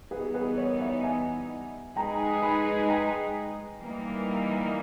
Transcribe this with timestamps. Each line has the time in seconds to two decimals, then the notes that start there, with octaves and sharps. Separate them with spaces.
0.11 E3 G3 B3 D#4 G#4 B4
0.34 G#4 B4
0.57 A#4 C#5
0.80 C#5 E5
1.03 E5 G#5
1.96 G#3 D#4 G#4 B4 G5 A#5
2.43 G#5 B5
2.89 G5 A#5
3.82 E3 G3 A#3 D#4